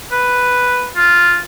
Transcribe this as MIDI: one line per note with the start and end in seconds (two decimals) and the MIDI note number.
0.12 0.86 71
0.96 1.40 65